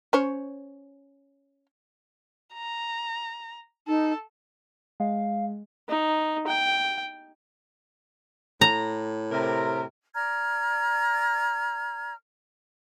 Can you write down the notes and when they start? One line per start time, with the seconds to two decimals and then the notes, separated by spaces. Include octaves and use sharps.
0.13 C#4 C5 C#5
2.54 A#5
3.88 D#4 A4
5.00 G#3 F5
5.89 D#4
6.47 G5
8.61 A2 A#5
9.31 C3 A#4
10.14 D5 A#5 F6 G#6